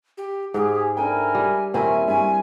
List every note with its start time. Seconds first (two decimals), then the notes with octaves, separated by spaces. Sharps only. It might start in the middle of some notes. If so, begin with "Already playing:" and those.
0.18 G4
0.54 G#2 G4 G#4
0.97 D4 E4 A4 A#4 G5 G#5
1.35 G3
1.74 D#1 C4 C#4 E4 A#4 E5 G#5
2.07 G2 E5 G#5